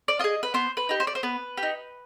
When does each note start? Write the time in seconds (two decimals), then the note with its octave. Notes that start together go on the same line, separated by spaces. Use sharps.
0.08 D5
0.19 F4 G#4 D#5
0.43 B4
0.54 B3 C5
0.77 B4
0.89 D#4 G4
1.00 C5
1.07 D5
1.15 C5
1.23 B3 B4
1.57 G4
1.63 D#4